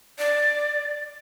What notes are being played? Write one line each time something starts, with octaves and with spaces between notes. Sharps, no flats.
D5